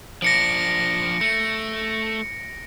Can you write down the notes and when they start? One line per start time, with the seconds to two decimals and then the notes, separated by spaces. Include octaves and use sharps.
0.22 F3 D4 A#6 C#7 D7
1.21 A3 C#7